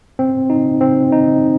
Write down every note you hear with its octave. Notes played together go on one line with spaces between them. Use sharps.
C4
D#4
C4
D#4